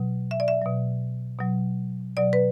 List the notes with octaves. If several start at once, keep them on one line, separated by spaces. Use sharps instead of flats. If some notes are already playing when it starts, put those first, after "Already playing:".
Already playing: B2 F#3
E5
D5
E5
B2 F#3
B2 F#3
B2 F#3 D5
B4